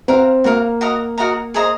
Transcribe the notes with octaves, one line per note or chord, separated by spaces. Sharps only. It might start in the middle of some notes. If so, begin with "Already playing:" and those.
C4 F#4 A#4 F5
A#3 F#4 A#4 F5
F#4 A#4 D#5 A#5
F#4 A#4 D#5 A#5
G#4 C5 D#5 A#5